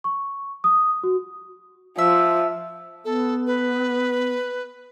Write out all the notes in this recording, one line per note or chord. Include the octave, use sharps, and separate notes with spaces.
C#6
D#6
F#4
F3 E5
B3 A4
B4